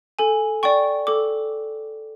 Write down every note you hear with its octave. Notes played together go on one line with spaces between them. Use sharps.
A4 G#5
D5 G5 C#6
A4 D6